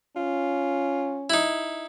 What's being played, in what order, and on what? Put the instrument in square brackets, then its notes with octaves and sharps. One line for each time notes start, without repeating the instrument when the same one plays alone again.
[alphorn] C#4 [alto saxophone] F4
[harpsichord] D#4 E4